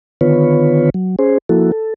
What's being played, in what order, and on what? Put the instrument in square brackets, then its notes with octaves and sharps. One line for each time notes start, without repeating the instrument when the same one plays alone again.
[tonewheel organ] D3 D#3 B3 F4 B4 C#5
F#3
C#4 G#4 C5
F3 A#3 E4 F#4 A4
A4